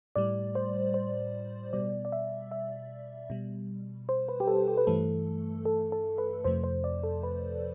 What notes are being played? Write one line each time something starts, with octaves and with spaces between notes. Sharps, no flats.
A2 G3 D5
C5
C5
B2 G3 D5
D5
E5
E5
B2 G3
C5
B4
G4
A4
G4
B4
G2 E3 A3 A4
A4
A4
B4
F2 C3 F3 A3 C5
C5
D5
A4
B4